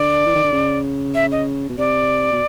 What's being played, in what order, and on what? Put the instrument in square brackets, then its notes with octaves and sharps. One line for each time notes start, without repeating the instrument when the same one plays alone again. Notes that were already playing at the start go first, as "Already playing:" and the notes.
Already playing: [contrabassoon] D3 [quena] D5
[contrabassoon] E3
D#3
D3
C#3
[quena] E5
D#5
[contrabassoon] B2
[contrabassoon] C3 [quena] D5
[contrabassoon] B2